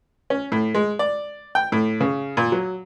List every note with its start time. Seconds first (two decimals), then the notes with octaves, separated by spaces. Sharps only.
0.30 C#4
0.52 A2
0.75 G#3
0.99 D5
1.55 G5
1.72 A2
2.01 C#3
2.37 A#2
2.52 F#3